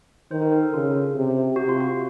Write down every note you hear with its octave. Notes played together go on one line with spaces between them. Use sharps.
D#3 C5
A#4
A#4
A4
C#3 F4
C3
C3 F#4
F4
F#4